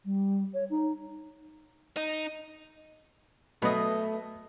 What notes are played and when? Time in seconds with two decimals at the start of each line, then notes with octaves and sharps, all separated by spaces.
0.04 G3
0.53 C#5
0.70 D#4
1.97 D#4
3.62 B2 F#3 A3 B3 B4 D#5